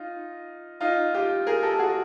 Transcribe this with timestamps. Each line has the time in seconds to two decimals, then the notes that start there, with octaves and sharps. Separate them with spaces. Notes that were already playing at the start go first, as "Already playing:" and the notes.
Already playing: D#4 F4
0.81 D#4 F4
1.14 F4 G4
1.47 G#4 A#4
1.63 G4 A4
1.79 F#4 G#4